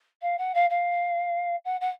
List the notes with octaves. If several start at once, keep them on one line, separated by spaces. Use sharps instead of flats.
F5
F#5
F5
F5
F#5
F#5